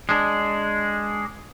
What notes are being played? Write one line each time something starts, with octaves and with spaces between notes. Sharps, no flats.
G#3 D4